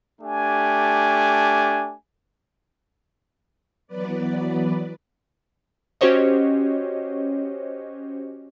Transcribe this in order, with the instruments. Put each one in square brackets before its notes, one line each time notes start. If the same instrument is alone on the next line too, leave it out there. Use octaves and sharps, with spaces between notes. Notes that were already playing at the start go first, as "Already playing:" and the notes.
[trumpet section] A3 D4 G4 G#5
[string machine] E3 F#3 B3 B4 D5
[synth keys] C#4 F#4 G4 C5 C#5 D#5